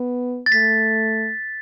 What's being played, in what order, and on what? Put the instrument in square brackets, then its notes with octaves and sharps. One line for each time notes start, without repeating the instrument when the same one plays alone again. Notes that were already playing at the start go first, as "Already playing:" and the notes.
Already playing: [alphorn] B3
[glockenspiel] A6
[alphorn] A3 [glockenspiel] B6